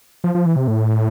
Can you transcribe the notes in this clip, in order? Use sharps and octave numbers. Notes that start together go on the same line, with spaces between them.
F3
F3
E3
C3
A2